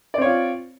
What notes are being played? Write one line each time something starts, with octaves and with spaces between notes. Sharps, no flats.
C4 F4 C#5 D5